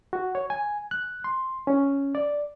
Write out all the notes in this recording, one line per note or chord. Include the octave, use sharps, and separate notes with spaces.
F#4
C#5
G#5
F#6
C6
C#4
D5